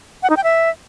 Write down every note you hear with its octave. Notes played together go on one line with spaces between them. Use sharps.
F#5
D#4
G5
E5